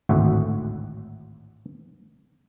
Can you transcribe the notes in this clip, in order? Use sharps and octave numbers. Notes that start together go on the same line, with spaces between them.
G#1 D2 A2 F#4 E5 F#5